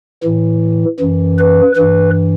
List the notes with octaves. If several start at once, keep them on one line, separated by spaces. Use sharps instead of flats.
A2 E3
F#2 E3
B4
G2 E3 B4